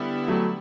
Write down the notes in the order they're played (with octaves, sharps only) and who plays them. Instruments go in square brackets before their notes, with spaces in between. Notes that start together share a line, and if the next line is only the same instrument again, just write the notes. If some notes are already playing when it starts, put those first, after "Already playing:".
Already playing: [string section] D3 G3 B3 E4
[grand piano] F#3 A3